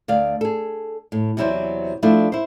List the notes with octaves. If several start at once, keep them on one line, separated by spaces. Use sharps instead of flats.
D2 D5 F5
G#4 A4
A2
E2 C3 F#3 E4 C5 D5
F3 A3 D4 E4
E4 C5